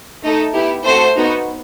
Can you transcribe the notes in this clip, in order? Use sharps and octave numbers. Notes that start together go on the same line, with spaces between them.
A3 D#4 A4
B3 E4 G4
A3 C4 F#4 A4 C5
B3 D#4 F#4